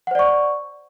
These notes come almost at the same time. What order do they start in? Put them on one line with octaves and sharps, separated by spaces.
F#5 C5 D5 C#6